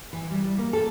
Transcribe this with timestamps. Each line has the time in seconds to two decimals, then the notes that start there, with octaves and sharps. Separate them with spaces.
0.13 E3
0.31 G3
0.44 G3
0.58 A#3
0.73 A4